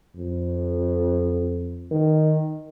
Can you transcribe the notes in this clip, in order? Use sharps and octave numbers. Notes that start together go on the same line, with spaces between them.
F2
D#3